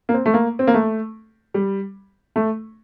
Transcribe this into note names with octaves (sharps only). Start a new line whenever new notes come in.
A#3
C4
A3
A#3
C4
A#3
A3
G3
A3